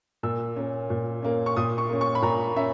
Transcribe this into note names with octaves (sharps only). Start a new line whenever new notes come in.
A#2 E6
A#3 C#4
A#2
A#3 C#4
C#6
A#2 D#6
C#6
A#3 C#4
C#6
B5
A#2 A#5
C#4 E5